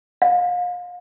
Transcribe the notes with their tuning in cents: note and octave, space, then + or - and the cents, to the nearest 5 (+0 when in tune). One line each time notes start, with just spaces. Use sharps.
F5 +35